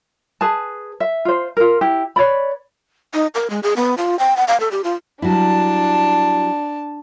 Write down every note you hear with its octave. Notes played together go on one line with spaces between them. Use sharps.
G#4 B4 A5
E5
F4 C5
F4 A#4
E4 G4
B4 C#5 D5 B5
D#4
A#4
G#3
G#4
B3
F4
G5
F#5
F5
A4
G4
F4
F#3 G3 D4 E4 A5